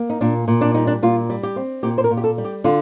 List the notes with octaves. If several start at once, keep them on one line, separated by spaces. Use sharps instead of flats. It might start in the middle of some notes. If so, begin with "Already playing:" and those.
Already playing: A#3
D#4
A#2 D4
A#2
D4
G3 D#4
D4
A#2 F4
G3
G4
C4
A#2 G4
C5
A#4
A#2
G4
A4
G3
G4
D3 F4